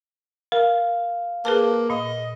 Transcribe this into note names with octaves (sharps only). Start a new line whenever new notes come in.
A#4 F5
A#3 G#4 B4 A5
A#2 D#5